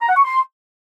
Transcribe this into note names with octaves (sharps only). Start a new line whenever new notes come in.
A#5
F#5
C#6
C6